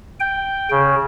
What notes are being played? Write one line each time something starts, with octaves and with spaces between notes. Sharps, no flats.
G5
C#3